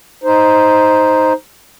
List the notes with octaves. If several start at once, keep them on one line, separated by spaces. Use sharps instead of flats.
D#4 C5